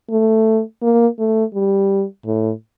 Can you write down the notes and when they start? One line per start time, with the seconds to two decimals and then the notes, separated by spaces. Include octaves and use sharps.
0.11 A3
0.82 A#3
1.19 A3
1.54 G3
2.26 A2